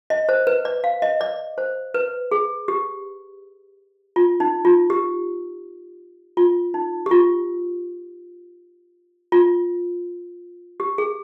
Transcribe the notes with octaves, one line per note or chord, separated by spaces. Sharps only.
D#5
C5
B4
D5
F5
D#5
D5
C5
B4
G#4
G4
F4
D#4
F4
G4
F4
D#4
G4
F4
F4
G4
G#4